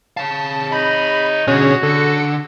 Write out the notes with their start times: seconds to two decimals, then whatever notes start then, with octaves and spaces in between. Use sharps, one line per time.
0.17 C#5 F5 A5
0.72 D#4 B5
1.47 B2 D3 C#4 F#4 G#4 C#5
1.83 D3 A4 C#7